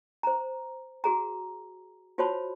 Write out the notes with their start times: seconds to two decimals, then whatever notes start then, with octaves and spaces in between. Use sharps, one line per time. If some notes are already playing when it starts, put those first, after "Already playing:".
0.23 C5 A#5
1.04 F#4 G#4 A#5
2.18 F4 F#4 C5 C#5 A5 B5